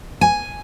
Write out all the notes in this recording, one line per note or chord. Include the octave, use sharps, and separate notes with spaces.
G#5